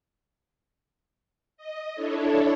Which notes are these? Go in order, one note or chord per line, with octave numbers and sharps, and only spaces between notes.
D#5
D4 E4 A4 C#5